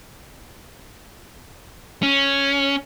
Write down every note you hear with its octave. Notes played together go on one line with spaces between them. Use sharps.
C#4